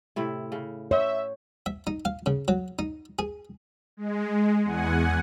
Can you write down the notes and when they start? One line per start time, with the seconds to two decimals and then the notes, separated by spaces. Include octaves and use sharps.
0.16 A2 C3 E4
0.52 C#3
0.91 C5 C#5 E5 F#5
1.66 E5
1.87 D#4
2.05 F5
2.26 C#3
2.48 F#3
2.79 D#4
3.19 G#4
3.97 G#3
4.64 E2 F#5 G#5